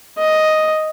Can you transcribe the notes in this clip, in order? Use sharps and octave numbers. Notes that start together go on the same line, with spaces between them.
D#5